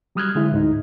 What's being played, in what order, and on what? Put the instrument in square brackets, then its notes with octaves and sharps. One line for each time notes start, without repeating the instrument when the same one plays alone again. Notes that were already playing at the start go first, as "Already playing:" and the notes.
[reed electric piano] F#3 G3 D#6 F6 F#6 G#6
D3 G#3 E4
D2 G#2 D#4